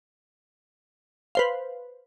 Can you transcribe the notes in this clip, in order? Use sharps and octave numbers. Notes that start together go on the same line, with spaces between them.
B4 C5 F5